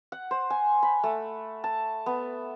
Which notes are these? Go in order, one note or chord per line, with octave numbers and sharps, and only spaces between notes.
F#5
C5
G#5
B5
A3
A5
B3